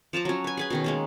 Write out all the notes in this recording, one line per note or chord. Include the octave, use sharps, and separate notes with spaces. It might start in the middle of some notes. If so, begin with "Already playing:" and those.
F3 A5 A#5 D6
F#3 C#4
B4 G#5
G#4 B4 G#5
B2 D#3 C#4
G#3 A#3 G#4